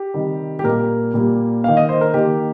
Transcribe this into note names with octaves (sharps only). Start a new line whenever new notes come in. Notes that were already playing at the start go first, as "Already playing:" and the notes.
Already playing: G4
C3 D#3 G3
G4
A#2 G3 A#3 A#4
A#2 G3 A#3
D#3 A#3 F5
D#5
C5
A#4
D#3 A#3 G4